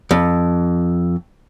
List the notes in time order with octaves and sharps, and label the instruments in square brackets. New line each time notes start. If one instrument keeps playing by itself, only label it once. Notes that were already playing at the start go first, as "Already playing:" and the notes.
[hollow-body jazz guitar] F2